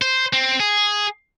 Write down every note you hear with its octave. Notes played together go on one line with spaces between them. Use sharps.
C5
C4
G#4